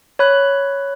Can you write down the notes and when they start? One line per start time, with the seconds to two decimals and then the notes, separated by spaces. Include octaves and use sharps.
0.19 C#5 B5 F#6